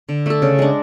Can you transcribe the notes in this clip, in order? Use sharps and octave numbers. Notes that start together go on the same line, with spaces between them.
D3
A3 D4 A4
C#3
G#3 D4